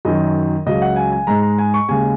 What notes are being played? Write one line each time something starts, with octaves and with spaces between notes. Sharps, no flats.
F#2 D#3 F#3 D#5
C#2 C#3 F#3 D#5
F#5
G#5
G#5
G#2 G#3 A#5
A#5
G#5
C#6
D#2 C#3 G#3 G#5